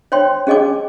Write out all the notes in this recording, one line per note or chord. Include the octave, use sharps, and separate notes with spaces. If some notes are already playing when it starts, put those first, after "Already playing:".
C5 C#5 G5 C6
C#4 G#4 D#5 G#5 D6